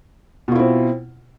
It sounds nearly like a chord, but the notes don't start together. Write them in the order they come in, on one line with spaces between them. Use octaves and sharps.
B2 F4 E4 C4